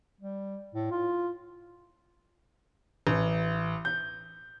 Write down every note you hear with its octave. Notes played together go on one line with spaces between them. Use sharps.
G3
A2
F4
A1
G6